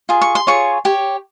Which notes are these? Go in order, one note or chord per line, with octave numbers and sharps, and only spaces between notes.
F4 G#4
C#6
C6
F4 G#4 C#5 C#6
G4 C#5